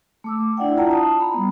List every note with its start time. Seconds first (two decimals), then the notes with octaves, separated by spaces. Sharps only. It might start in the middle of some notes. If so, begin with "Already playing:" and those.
0.24 A3 D6 E6
0.57 D4 E4 D5 E5 F#5 G5
0.76 E4 F4 D5 F#5 A5 A#5
0.90 A5 D#6
1.20 A#5 B5
1.34 G3 B3